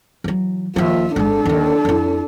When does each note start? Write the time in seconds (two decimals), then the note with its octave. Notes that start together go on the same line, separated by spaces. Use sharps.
0.24 E3 F#3
0.76 D#2 F3 F4 E5
1.16 G#1 G#2 D4 A4
1.45 D#2 D3
1.85 F2 E4